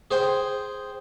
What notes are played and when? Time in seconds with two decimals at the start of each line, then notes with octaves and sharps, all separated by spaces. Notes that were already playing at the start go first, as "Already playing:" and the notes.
0.11 G#4 C5 G5